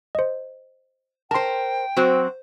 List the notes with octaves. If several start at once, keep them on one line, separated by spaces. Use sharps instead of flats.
C5 D#5
A#4 C5 G5 A5 C6
F#3 C4 F#4 C5